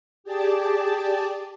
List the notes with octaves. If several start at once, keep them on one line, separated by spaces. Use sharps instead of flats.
G4 G#4 D5 A5